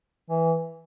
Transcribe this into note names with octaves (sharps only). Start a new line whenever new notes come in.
E3